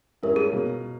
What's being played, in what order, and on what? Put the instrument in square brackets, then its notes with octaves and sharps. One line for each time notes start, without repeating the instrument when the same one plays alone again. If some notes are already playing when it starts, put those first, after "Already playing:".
[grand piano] G#2 G3 C#4 E4 [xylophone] A#4
[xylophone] G#4
[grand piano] B2 A#3